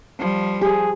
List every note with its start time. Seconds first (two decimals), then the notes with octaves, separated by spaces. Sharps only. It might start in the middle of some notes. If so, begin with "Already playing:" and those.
0.19 F3 G3
0.61 G4 G#4